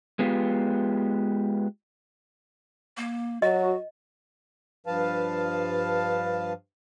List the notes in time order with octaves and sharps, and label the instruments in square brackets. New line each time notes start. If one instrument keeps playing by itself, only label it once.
[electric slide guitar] G#3 B3 F4 G4
[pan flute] A#3
[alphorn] F#3 [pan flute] F#4 [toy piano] D#5
[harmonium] G2 F3 B4 F5 A5